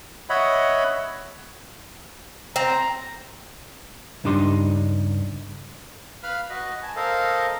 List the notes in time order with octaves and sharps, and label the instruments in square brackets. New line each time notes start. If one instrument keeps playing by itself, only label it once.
[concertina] C#5 D#5 E5 F#5 B5
[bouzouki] C4 [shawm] A#5
[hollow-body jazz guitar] C#2 G2 D4 D#4 G4 C6
[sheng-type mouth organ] B4 F5 B5 F6
F#4 B4 D#5
G#5 A5
A4 A#4 C5 D#5 F5